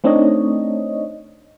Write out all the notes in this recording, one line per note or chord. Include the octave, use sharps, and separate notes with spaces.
A3 C4 D4 D#4 C#5 D#5